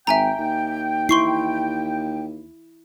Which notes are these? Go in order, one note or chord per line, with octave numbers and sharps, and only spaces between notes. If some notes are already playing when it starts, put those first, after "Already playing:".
G#1 E5 G5 G#5 A#5
D#2
E4 C6 C#6 C7